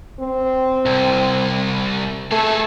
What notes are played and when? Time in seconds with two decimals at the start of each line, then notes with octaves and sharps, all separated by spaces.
0.20 C4
0.86 C2
2.31 A3 G#4 A4